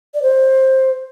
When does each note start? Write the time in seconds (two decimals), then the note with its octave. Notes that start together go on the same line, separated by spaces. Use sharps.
0.14 D5
0.22 C5